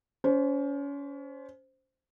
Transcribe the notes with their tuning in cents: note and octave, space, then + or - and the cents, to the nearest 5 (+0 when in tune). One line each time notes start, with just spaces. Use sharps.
C#4 +30 C5 +0